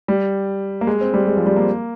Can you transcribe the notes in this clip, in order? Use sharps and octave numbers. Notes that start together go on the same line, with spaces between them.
G3
A#3
G#3
C4
G3
G#3
F3
G3
A#3